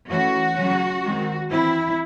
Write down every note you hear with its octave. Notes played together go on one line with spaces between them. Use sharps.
E3 A3 C#4 F#4
C#3 F#3 C#4
D#3 G#3 C4
E3 C4 E4